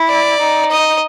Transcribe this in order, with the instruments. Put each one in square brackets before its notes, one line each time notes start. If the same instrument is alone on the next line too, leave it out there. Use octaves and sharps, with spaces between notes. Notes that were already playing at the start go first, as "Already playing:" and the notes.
Already playing: [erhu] E4
[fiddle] D5
[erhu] D#4
[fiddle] D#5